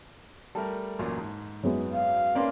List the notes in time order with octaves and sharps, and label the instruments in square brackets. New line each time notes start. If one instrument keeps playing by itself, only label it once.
[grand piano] G3 A3 A#4 [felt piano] A5
[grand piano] A1 F#2 A#2
G#2
[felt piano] F#2 G#3 B3
[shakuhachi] F5
[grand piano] A#3 B4 D5 [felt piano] C#4 C6